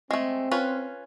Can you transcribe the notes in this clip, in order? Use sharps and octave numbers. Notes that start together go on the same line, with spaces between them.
G#3 A3 C4
C#4 F4 B4